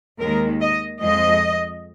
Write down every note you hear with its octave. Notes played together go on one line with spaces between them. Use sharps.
D#2 D#3 G#3 A#4
D#5
F2 F3 G#3 D#5